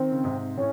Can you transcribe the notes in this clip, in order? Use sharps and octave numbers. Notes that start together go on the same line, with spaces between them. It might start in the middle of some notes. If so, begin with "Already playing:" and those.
Already playing: D#3 C4
C#3
G#2 C3
A2 C#4